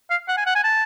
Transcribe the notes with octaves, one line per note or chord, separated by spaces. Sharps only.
F5
F#5
G#5
F#5
G#5
A5